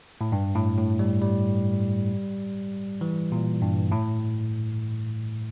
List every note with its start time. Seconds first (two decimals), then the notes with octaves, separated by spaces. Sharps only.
0.21 A2
0.32 G2
0.55 A2
0.78 A2
0.99 G3
1.22 G3
3.01 E3
3.32 A#2
3.62 G2
3.92 A2